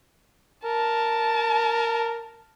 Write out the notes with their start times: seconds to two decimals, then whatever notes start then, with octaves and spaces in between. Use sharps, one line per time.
0.65 A#4 A5